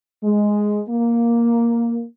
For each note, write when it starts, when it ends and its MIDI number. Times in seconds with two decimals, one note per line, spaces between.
0.24 0.82 56
0.89 2.04 58